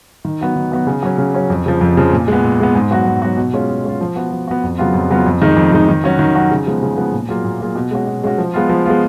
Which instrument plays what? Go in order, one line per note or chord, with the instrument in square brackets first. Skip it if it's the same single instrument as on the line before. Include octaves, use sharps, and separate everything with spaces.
[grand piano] D#3
F#3 B3 F#4
D#3
F#3 B3 F#4
C#3
F#3 C#4
C#3
F#3 C#4
F2
C#3 F3
F2
C#3 F3
A#2
G#3 B3
A#2
G#3 B3
G#2
F#3 B3 F#4
G#2
F#3 B3 F#4
B2
G#3 C#4 F4
B2
G#3 C#4 F4
F3
B3 F#4
F3
B3 F#4
F2
C#3 F#3 B3 F4
F2
C#3 F#3 B3 F4
F2
D#3 G#3 D#4
F2
D#3 G#3 D#4
D#3
F#3 C#4 F#4
D#3
F#3 C#4 F#4
C#3
F3 G#3 B3
C#3
F3 G#3 B3
A#2
F#3 A#3 F4 G#4
A#2
F#3 A#3 F4 G#4
B2
G#3 C#4 F#4
B2
G#3 C#4 F#4
F3
G#3 B3 F4
F3
G#3 B3 F4